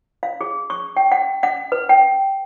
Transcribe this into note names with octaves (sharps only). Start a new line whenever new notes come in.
F5
G#4
C#6
G5
F#5
F#5
B4
G5